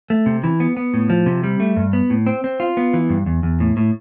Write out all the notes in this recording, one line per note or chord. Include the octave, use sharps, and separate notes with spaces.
A3
C3
E3
B3
B3
A2
F3
C3
G3
A3
G2
B3
A2
C4
C4
F4
B3
E3
G2
E2
E2
A2
A2